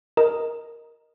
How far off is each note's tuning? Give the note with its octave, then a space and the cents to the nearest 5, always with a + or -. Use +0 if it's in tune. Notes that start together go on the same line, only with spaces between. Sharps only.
A#4 +0 D#5 +0